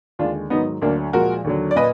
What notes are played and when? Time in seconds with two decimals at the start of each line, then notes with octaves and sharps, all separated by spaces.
0.19 D#2 D3 G#3 D4 F4
0.50 G#2 D#3 F#3 B3 D#4
0.82 D2 D3 F#3 A#3 D4
1.13 A#2 F3 G#3 F#4 A#4
1.44 D#2 D3 F#3
1.71 D5
1.76 A#2 B4 D#5